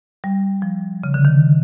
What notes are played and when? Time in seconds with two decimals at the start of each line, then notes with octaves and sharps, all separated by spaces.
0.24 G3
0.62 F3
1.04 C#3
1.14 D3
1.25 D#3